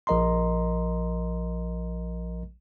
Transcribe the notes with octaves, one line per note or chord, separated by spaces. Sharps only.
A#1 F3 A#4 D#5 A#5 C6